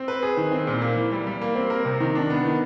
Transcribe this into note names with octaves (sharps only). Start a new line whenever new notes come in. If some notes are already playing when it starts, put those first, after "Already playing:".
Already playing: C4
B4
G#4
D#3
C4
A#2
A#3
E3
G3
G3
A#3
C4
A#4
C3
D#3
D4
B3
D#3